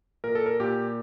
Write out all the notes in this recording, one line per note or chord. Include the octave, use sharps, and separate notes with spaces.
A#2 A#4
A4
A#4
A#2 G4